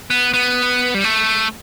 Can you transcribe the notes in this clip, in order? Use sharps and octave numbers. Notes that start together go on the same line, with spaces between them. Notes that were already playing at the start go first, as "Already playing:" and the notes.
B3
B3
G3
A3